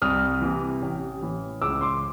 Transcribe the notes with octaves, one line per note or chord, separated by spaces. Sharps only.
C2 D#6 F6
C3 E3
A1
A2 E3
C#2 D6 E6
C6 D6